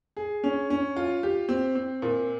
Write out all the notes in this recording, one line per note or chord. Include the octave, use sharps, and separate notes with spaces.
G#4
C#4
C#4
F4
G4
C4
C4
A#2